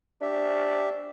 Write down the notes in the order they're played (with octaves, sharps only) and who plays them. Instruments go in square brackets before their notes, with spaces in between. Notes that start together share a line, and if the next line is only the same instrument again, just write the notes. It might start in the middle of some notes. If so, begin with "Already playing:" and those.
[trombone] D4 [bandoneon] G4 E5